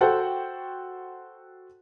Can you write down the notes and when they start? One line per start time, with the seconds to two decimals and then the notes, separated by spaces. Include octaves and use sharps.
0.01 F#4 A4 C5 F#5 G5